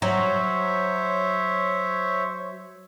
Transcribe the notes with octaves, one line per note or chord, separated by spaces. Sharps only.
F#3 C5 C#5 E5